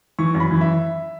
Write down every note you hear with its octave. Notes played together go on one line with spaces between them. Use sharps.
E3 C#6
F#2
B5
E3
E5